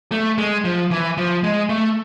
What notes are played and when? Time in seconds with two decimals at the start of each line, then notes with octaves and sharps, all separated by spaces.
0.12 A3
0.38 G#3
0.64 F3
0.91 E3
1.17 F3
1.43 G#3
1.69 A3